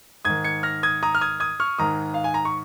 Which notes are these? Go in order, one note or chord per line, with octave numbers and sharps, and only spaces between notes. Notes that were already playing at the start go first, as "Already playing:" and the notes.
G#2 D#3 D#6 G#6
G#6 C#7
F6 A#6
D#6 G#6
A#5 D#6
F6
D#6 G#6
D#6 G#6
C#6 F6
G#2 D#3 A#5 D#6
F5
G#5
A#5
C#6